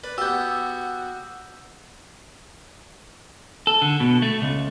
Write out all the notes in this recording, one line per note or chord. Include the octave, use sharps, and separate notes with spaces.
B4 D5
B3 F#4 G4 E6 G6
A4
D3
B2
A3
C#2